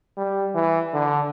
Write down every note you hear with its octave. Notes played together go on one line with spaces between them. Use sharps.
G3
E3
D3